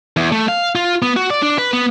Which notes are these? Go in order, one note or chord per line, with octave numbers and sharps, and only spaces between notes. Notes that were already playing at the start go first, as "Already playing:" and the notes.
E2
A3
F5
F4
B3
F#4
D5
D4
B4
B3